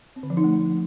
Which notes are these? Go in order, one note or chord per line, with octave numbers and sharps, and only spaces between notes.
C4
D3
F3
D#4
A3